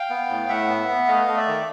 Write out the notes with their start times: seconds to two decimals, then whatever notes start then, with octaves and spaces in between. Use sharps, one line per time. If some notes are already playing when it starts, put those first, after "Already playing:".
Already playing: F5 G5
0.10 B3
0.29 A2
0.49 A2 E5 F#5
0.69 B3
0.89 B3
1.08 A3 D#5 F5
1.28 A3
1.37 D5 E5
1.47 D#3